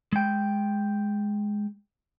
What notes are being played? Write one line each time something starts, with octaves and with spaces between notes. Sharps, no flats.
G#3 G5